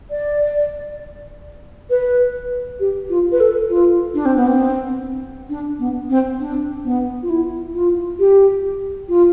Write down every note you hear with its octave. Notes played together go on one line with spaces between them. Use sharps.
D5
B4
G4
F4
B4
A4
F4
D4
C4
B3
C4
D4
B3
C4
D4
B3
F4
E4
F4
G4
F4